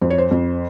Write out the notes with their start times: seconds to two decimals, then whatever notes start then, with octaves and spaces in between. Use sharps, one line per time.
0.01 F2 C5
0.10 C#5
0.18 C5
0.31 F2